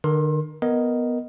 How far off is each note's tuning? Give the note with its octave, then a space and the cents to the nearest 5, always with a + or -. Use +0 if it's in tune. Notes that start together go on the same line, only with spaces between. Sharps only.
D3 +45 A#4 +20 C6 +30
B3 +0 A#4 +0 D#5 +0